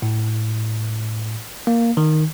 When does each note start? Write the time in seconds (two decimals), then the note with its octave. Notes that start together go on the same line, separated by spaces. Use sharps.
0.02 A2
1.67 A#3
1.97 D#3